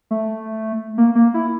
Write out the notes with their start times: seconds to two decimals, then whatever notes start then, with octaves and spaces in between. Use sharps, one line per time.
0.11 A3
0.98 A#3
1.15 A#3
1.34 E4